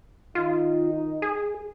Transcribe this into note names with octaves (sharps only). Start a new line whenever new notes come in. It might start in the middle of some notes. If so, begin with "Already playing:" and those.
D#3 D#4 F4
G#4